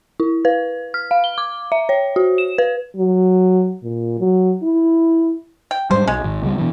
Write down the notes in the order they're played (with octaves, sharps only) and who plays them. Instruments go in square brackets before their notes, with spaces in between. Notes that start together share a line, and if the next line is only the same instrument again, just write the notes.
[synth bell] E4
B4
F6
F5
G7
D6
E5
C#5
F#4
E7
B4
[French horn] F#3
A#2
F#3
E4
[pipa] G5
[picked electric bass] G#2 G3 [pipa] C5
[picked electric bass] B1 [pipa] G#3
[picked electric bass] G#1
C#2 G3
B2 E3